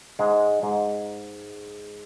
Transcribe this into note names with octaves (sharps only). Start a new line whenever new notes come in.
G#2 G#3
G#2 G#3